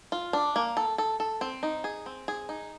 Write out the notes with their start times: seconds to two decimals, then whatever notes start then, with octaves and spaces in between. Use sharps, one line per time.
0.12 F4
0.33 D4
0.56 A#3
0.77 A4
0.98 A4
1.20 A4
1.41 C4
1.63 D#4
1.84 G#4
2.06 C4
2.28 G#4
2.49 D#4